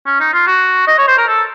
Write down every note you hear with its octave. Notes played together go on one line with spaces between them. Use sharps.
C#4
D#4
F4
F#4
D#5
C#5
C5
A#4
A4